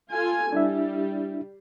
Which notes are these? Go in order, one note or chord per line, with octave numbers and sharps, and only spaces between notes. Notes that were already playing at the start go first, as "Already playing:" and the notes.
F4 A4 G#5
G3 D4 E4 E5